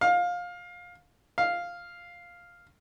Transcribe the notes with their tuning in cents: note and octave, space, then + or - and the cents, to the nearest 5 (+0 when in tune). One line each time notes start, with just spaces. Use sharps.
F5 +20
F5 +0